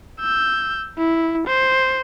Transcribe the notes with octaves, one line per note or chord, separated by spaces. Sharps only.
E6 G6
E4
C5